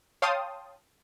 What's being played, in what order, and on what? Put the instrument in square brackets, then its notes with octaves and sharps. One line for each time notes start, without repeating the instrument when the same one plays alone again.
[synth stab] C#5 F5 G5 A5 C6 D#6